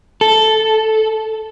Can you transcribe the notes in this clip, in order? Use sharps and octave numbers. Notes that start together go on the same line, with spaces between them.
A4